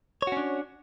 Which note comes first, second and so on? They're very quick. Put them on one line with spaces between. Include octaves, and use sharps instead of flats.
C#5 F#4 C#4 D4